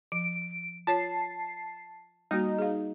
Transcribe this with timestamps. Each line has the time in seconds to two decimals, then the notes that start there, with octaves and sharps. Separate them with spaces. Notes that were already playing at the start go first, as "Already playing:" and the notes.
0.12 F3 D7
0.87 F4 C#5 A5 C7
2.31 G3 A#3 D#4 F#4
2.58 G#4 F5